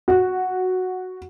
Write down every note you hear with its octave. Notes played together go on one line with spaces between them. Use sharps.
F#4